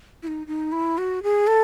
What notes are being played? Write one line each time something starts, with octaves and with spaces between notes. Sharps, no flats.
E4
D#4
D#4
E4
F#4
G#4
A4